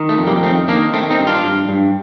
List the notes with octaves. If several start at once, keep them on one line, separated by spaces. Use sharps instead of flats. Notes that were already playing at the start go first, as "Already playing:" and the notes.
Already playing: D#3
A3
F2
G3 A#3
D#3 A3 C4
D#3 A#3 D4
D#3 A3 C4
C4 D#4
G2
D4 F4
G2
G2